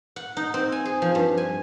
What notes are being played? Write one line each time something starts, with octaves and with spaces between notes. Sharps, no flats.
F#5
D#4
C4
G#5
G#4
F3
G2
G#5